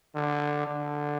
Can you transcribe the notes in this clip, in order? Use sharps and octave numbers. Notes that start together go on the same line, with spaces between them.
D3
D3